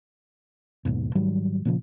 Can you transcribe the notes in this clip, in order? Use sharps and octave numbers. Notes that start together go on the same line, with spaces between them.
F#1 D#2 G#2 B2
G#2 D#3 F#3 G3
A#2 C#3 F3